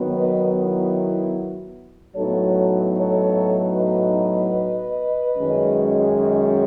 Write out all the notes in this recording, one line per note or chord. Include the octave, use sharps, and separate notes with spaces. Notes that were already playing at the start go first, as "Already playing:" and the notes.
Already playing: D#3 F#3 B3
B4 D#5
E4
A2 F#3 B3 D#4 A4 C#5
A4 C#5
B4 D#5
F#2 D#3 G#3 C#4